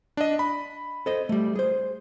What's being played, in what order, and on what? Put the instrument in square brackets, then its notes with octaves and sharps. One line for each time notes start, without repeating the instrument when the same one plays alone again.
[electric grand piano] D4 D#5
B5
[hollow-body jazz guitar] A4 C5 D#5
G3 A3
G#4 C5